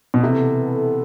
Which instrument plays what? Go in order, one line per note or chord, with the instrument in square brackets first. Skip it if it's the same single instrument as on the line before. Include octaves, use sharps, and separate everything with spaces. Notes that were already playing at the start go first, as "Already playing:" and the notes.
[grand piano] B2
[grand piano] C3 [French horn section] E3 B3 E4 A4